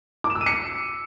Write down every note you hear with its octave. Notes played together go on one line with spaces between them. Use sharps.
D6
E7
E6
D#7
C#7